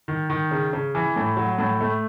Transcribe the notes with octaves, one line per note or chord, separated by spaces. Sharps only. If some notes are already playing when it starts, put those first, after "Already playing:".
D#3
D#3
C#3
C#3
E3
A2
F#3
A2
A3